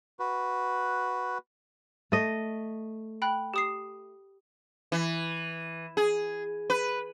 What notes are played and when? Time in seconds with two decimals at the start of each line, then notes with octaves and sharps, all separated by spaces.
0.20 F#4 B4
2.12 A3 D#5
3.22 G5 B5 F#6
3.54 G4 D#6 C7
4.92 E3
5.97 G#4
6.70 B4